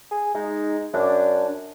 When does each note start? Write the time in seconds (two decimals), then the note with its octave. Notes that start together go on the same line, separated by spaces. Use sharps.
0.11 G#4
0.35 G#3 D#4
0.94 F#2 D4